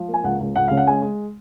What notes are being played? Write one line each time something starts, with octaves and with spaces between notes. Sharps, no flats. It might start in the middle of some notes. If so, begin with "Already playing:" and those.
Already playing: F3
A#3
G#5
C#2 F#5
C#2
C#2 F#5
C#3 F5
F#5
G#3 G#5
G#3